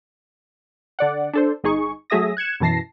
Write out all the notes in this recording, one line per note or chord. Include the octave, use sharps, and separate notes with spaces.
D3 D5 F#5
D4 A4 C5
G1 D#4 G#4 C#6
F#3 A3 G#4 E5 D#6 A#6
F#6 G#6 C#7 E7
F#2 B2 E3 A5 A#6 C7